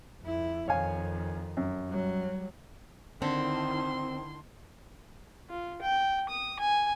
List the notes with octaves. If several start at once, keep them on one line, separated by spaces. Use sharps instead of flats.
F2 E4
F2 D#3 C#5 F5 G#5
F#2
F#3 G3
D3 D#3 C4 E4 C6
F4
G5
D#6
G#5